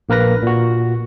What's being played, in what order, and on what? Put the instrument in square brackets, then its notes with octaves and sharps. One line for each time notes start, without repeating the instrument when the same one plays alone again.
[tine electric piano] A#1 A#3 A#4 B4 A#6
A#2 F#4